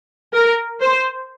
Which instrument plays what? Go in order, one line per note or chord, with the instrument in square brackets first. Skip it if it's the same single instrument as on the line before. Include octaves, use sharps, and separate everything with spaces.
[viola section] A#4
C5